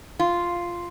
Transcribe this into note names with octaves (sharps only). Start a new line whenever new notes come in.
F4